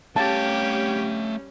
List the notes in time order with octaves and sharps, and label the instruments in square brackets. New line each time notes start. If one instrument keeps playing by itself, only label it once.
[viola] G3 C#4 [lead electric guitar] A3 F5 [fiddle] G4 C#5 [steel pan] A5